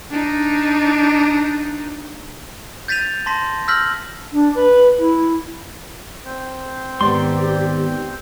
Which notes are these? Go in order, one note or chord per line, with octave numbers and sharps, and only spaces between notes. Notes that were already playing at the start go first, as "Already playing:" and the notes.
D4 D#4
G6 A6 B6 D#7 F7
A5 C6 A#6 B6
E6 F6 G6 A#6 B6 F#7
D4
B4
E4
C4 C5 G5
G#2 D#3 B3 G4 D5 C6